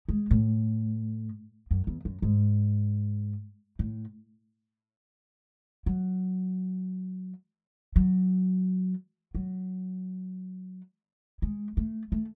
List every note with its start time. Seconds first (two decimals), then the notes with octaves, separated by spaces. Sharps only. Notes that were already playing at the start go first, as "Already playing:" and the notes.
0.09 G#3
0.31 A2
1.71 F#2
1.87 E2
2.05 F#2
2.22 G#2
3.79 A2
5.86 F#3
7.96 F#3
9.35 F#3
11.42 G#3
11.77 A3
12.12 A3